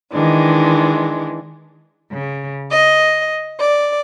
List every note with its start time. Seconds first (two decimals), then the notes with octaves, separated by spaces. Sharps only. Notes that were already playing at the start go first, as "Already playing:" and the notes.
0.13 D#3 E3 G#3 D4
2.12 C#3
2.70 D#5
3.59 D5